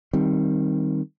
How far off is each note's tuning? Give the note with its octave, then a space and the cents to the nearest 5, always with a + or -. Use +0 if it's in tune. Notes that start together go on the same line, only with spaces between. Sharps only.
D#3 +0 G3 +0 C4 +0